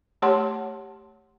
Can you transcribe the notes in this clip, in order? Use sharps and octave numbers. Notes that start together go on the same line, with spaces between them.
A3 G4 C#5 F#5 A5 C6